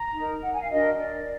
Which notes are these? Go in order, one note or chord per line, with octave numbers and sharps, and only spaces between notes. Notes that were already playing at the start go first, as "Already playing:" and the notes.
Already playing: A#5
D#4 A#4
F#5
G#5
F5
D4 F#4 A#4 D#5
D5